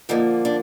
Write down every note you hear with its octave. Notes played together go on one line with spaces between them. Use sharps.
D3 F3 A#3 D#4
D4